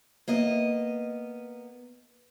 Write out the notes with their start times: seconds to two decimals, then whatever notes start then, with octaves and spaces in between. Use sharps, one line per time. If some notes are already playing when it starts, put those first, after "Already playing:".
0.28 A#3 B3 D#5